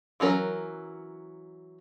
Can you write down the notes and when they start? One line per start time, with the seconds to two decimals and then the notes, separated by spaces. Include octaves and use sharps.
0.20 E3 F#3 C#4 A#4